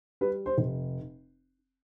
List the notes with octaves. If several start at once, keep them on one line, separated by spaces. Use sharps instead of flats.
G3 B4
C5
F1